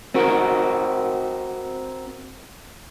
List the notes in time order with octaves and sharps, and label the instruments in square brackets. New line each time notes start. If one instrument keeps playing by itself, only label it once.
[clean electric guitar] C4 F#4 A#4